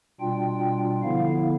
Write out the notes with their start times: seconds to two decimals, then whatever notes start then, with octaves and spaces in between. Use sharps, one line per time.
0.20 B2 G3 D4 F4 G5
1.03 D3 F3 B3 E4 F5